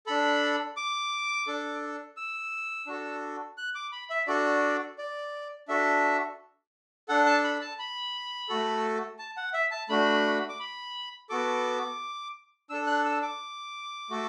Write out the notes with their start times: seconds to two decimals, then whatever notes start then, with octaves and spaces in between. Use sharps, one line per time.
0.07 D4 A4 B5
0.77 D6
1.47 D4 A4
2.17 E6
2.87 D4 F#4 A4
3.57 F#6
3.75 D6
3.92 B5
4.10 E5
4.27 D4 F#4 A4 D5
4.98 D5
5.68 D4 F#4 A4 E5
7.09 D4 A4 F#5
7.26 A5
7.44 B5
7.61 A5
7.79 B5
8.49 A3 F#4 A4
9.19 A5
9.37 F#5
9.53 E5
9.71 A5
9.89 A3 D4 F#4 B5
10.49 D6
10.60 B5
11.30 B3 F#4 A4 D6
12.70 D4 A4 E6
12.87 F#6
13.05 E6
13.22 D6
14.10 A3 F#4 A4